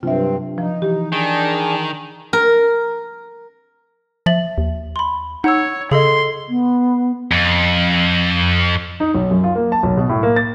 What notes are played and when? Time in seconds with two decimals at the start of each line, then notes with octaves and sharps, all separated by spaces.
0.03 G2 C3 F#3 C4 D4 F4 E5
0.58 F3 D#4
0.82 E3 G4
1.12 D#3 D4 G#4
2.33 A#4
4.26 F3 E5 A6 F#7
4.58 D#2
4.96 B5 C6
5.44 D#4 C#5 F#5 E6
5.91 C#3 G#4 A4 D#5 C6
6.49 B3
7.32 F2
9.00 D#4
9.15 B1
9.31 F#2
9.44 F4
9.55 A#3
9.72 A5
9.83 B1
9.97 B2
10.09 A2
10.23 A#3
10.36 A6